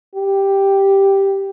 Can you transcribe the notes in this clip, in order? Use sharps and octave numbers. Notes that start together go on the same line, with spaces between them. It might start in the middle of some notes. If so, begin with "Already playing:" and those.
G4